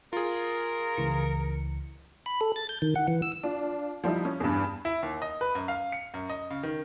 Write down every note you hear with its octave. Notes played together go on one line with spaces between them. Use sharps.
F4 G#4 A#4
C#2 E3 C#7
B5
A4
A6
G6
D#3
F#5
E3
E6
D4 F4
F3 G3 D#4 E4
C#4
E2 G2
E4
D#2
D#5
B4
F#2
F5
C#7
F#2
D#5
C#3
D#3